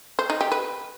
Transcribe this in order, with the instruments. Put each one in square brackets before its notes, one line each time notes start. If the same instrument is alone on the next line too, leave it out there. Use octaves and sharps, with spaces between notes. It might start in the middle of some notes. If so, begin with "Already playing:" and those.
[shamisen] C5
D#4
G4
B4